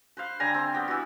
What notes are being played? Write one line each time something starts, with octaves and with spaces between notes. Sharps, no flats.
B4 C5 F5
D3 G3 G#5 A#5
C4
B3 G4
E3 F#4